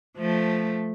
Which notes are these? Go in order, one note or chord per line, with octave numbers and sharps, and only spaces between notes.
F3 A3